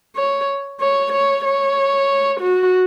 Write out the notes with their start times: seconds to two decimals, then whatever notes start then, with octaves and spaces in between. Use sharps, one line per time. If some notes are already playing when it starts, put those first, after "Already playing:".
0.16 C#5
0.81 C#5
1.12 C#5
1.45 C#5
2.40 F#4